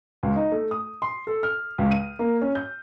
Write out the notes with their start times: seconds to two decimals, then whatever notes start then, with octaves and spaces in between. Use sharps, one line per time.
0.23 C#2
0.36 D#4
0.52 A3
0.71 D#6
1.02 C6
1.27 A4
1.43 F6
1.78 C#2
1.91 D#7
2.19 A#3
2.42 C#4
2.55 G6